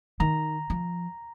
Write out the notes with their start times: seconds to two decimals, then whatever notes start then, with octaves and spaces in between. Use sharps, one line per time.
0.20 D#3 A#5
0.70 F3